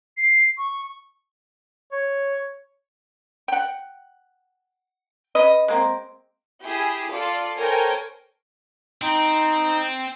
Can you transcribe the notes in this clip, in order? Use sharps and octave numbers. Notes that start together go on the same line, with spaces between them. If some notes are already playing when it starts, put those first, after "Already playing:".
C7
C#6
C#5
F#5 G5
C#4 B4 D#5
G#3 A#3 C4
E4 G4 G#4
F4 A4 D5
A4 A#4 C5 C#5 G5 G#5
C4 D#4